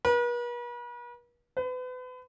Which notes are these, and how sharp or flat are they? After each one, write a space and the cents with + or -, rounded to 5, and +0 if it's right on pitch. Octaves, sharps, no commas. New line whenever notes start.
B4 -45
B4 +35